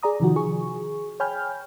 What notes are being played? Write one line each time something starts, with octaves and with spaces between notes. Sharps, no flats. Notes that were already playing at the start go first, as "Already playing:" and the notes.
G#4 D5 A#5 D#6
C3 D#3 F3 F#4
G#4 C#6
C#5 G5 G#5 B5 F6 G6